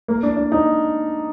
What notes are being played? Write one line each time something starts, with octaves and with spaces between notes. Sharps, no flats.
A#3
D4
D4
D#4